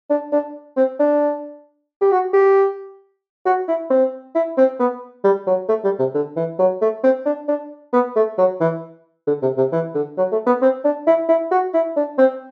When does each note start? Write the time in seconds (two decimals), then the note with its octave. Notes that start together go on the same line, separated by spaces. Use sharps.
0.10 D4
0.32 D4
0.77 C4
1.00 D4
2.01 G4
2.11 F#4
2.33 G4
3.46 F#4
3.68 E4
3.90 C4
4.35 E4
4.57 C4
4.79 B3
5.24 G3
5.47 F#3
5.69 A3
5.84 G3
5.99 C3
6.14 D3
6.36 E3
6.59 F#3
6.81 A3
7.03 C4
7.26 D4
7.48 D4
7.93 B3
8.15 A3
8.38 F#3
8.60 E3
9.27 D3
9.42 C3
9.57 C3
9.72 E3
9.94 D3
10.17 F#3
10.32 A3
10.46 B3
10.62 C4
10.84 D4
11.07 E4
11.29 E4
11.51 F#4
11.74 E4
11.96 D4
12.18 C4